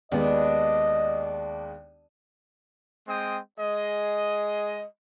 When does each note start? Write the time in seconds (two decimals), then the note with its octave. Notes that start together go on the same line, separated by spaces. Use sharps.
0.12 D#2 G#3 B3 D4 D#5
3.08 G#3 C4 G5 D#6
3.59 G#3 G#4 D#5